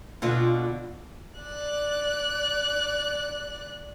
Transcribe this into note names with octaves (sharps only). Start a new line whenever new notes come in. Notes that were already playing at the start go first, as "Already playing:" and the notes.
B2 D3 F4
D5 F#6